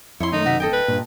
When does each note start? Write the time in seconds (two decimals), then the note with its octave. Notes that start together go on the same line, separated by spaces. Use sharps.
0.20 F2 E4 C#5 C6
0.32 F#2 D#3 A3 D#4
0.46 C3 F#4 E5
0.60 D1 A4 D#5 G5
0.73 B4
0.88 G2 A#2